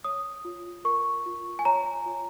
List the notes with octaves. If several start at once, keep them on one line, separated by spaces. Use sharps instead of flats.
C#5 D#6
F4
A#4 C#6
F4
G#5
C#5 A#5
F4